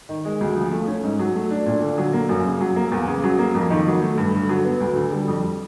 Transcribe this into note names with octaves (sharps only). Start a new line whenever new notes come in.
D#3
G#3
D2
F3
A3
C#4
G#2
F#3
A3
D4
A#2
D3
F#3
A#3
F#2
C#3
F#3
A#3
E2
C#3
F#3
A#3
F2
D#3
F#3
A3
G2
D3
F#3
B3
D2
D3
G3
F2